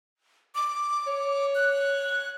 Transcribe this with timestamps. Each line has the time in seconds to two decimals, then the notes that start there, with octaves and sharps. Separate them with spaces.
0.55 D6
1.07 C#5
1.55 F#6